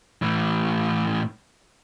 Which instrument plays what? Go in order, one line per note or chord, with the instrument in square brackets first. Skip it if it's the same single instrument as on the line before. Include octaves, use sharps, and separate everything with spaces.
[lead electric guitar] A2 E3